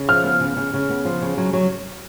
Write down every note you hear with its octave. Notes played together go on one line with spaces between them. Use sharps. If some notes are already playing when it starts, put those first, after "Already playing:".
Already playing: C#3
F3 F6
B3
C#3
C#3
C#3
B3
F3
C#3
F#3
F#3